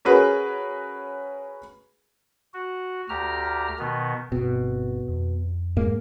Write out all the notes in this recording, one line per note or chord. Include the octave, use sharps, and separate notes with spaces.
C#4 F#4 G#4 A#4 B4
F#4
D2 G4 A#5 F6
B2 D#3 B3
G1 B2 B3 C4
F2
G#2 A#3